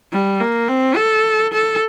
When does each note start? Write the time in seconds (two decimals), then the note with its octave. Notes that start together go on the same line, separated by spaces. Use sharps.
0.13 G3
0.41 A#3
0.68 C4
0.96 A4
1.53 A4